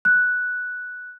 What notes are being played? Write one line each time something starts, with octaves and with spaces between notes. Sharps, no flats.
F#6